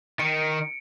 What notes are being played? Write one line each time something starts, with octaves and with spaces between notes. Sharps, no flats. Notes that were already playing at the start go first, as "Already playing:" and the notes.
D#3 C#7 D7